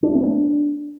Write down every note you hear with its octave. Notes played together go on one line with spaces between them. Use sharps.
D4
A3
C4
B3
D4